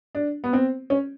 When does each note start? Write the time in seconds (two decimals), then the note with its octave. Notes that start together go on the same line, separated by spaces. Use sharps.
0.15 D4
0.44 B3
0.53 C4
0.90 C#4